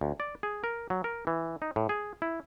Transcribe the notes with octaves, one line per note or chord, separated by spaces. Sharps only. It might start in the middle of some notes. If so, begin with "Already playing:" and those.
D2
D5
G#4
A#4
F#3
A#4
E3
D#4
A2
G#4
E4